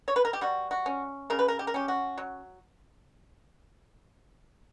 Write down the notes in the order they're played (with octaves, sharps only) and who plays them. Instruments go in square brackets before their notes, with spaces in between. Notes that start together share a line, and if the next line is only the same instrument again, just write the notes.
[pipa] C#5
B4
A#4
G4
G3 F#4
F#4
C#4
C#3 A#4
B4
A#4
G4
A#4
C#4 G4
F#4
F#3